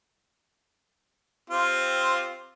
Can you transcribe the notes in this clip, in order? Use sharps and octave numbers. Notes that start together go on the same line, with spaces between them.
C4 F4 G4